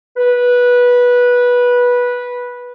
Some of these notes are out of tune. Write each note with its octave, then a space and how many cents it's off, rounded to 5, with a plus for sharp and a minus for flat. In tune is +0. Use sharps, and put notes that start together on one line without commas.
B4 -15